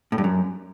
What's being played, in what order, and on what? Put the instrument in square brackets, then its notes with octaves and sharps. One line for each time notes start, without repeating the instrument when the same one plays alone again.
[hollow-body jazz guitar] A2
G2
F#2